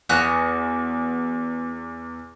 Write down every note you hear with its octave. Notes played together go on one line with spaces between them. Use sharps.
E2 B3 F#4 F#6